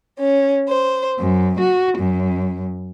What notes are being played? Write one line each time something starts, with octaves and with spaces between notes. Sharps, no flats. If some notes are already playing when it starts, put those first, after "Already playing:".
C#4
C5
F#2
F#4
F#2